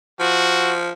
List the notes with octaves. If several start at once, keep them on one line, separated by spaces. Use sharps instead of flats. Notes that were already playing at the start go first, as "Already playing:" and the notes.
F3 F#4